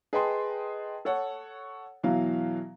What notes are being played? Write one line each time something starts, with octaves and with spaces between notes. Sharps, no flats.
G#4 B4 D#5 G5 A5 C6
A4 C#5 F#5
B2 E3 F#3 F5